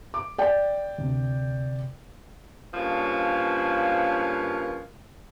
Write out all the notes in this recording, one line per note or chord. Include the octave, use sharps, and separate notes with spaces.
D6
D5 G5
D2 C3
G2 C#3 F3 A#3 B4 C#5